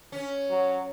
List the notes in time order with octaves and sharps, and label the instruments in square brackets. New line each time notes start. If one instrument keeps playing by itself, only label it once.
[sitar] C#4
[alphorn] F#3